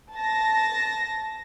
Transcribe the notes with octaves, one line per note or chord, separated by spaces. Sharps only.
A5 A#6